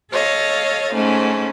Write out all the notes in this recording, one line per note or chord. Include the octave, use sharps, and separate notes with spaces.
A4 C#5 D#5 F5
G#2 A3 C#4